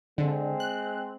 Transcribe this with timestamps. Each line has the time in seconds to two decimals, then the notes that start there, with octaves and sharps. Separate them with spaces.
0.18 D3 G#3 C4
0.60 F#6